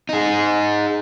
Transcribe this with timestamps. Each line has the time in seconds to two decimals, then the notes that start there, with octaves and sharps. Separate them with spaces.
0.09 D#4 G#4